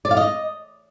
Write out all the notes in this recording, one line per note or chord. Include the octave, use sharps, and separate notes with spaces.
D5
F5
D#5